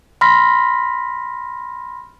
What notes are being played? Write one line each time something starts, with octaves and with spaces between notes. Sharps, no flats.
B5 C6 F6 A#6 B6